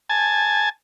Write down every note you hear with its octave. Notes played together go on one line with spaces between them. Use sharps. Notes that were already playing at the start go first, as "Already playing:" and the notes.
G#5 A5